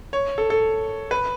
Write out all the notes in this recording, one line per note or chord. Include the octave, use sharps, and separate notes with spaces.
C#5
A4
A4
B4